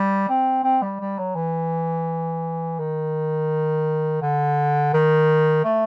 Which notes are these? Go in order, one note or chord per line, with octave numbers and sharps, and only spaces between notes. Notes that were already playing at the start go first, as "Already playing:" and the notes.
Already playing: G3
C4
C4
G3
G3
F#3
E3
D#3
D3
D#3
A3